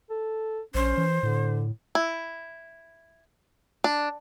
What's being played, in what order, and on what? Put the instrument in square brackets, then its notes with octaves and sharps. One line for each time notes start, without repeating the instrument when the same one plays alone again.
[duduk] A4
[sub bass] A#1 [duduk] C#4 [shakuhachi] C5
[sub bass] E3
[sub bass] A2 [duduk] D3
[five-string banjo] E4
D4